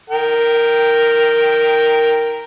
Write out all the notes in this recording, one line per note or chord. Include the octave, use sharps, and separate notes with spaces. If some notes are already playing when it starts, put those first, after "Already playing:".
A#4 G5